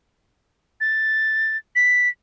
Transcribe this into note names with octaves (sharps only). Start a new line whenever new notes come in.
A6
B6